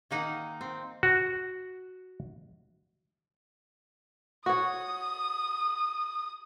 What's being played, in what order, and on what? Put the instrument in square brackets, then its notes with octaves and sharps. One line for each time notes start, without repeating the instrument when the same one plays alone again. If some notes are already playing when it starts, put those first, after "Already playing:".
[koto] D#3 A#3 D#4 F#5
C4
[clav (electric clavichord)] F#4
[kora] F#4 C#5 [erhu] D#6